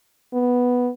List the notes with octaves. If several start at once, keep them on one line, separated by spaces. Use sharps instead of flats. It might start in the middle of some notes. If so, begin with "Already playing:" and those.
B3